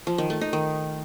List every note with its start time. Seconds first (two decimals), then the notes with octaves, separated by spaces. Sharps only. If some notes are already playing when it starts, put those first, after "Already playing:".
0.07 F3
0.18 D#3
0.30 A3
0.41 D#4
0.53 D#3